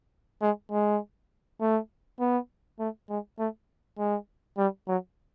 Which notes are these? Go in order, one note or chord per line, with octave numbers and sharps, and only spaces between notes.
G#3
G#3
A3
B3
A3
G#3
A3
G#3
G3
F#3